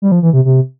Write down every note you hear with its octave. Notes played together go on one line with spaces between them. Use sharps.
G3
F3
E3
C3
C3